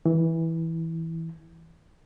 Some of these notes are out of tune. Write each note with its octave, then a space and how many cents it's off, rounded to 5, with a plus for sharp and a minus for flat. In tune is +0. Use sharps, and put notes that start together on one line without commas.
E3 -10